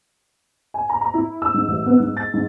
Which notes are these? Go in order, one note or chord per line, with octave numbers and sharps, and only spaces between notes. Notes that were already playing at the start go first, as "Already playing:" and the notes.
G#5
A#5
A#5
E4
E6
G#2
A1
B3
G#2
A6
G#2